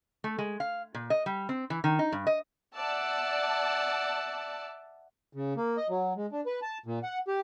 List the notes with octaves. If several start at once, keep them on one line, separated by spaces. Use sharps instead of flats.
A3
G#3
F5
A#2
D#5
G3
C4
E3
D#3
D#4
G2
D#5
D5 E5 F#5 A5
C#3
A#3
D#5
F#3
G#3
D4
B4
A5
A#2
F#5
G4